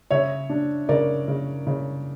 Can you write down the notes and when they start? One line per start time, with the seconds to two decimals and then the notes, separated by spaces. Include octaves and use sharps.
0.11 C#3 C#5 E5
0.50 D4
0.89 C#3 A#4 D5
1.28 C#3
1.67 C#3